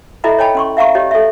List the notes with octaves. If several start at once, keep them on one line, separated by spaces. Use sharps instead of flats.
E4 A4 D#5 E5 A#5 B5
C#5 D#5 G5 A5 B5
C#4 C6 C#6
E5 F5 A#5 C#6
G4 C#5 D#5
A4 E5